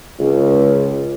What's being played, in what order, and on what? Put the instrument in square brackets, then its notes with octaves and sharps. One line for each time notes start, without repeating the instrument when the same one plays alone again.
[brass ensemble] C#2